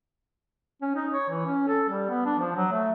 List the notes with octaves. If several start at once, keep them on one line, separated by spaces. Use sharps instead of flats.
C#4
D#4
C#5
E3
C#4
A4
G3
B3
D4
F3
F#3
A3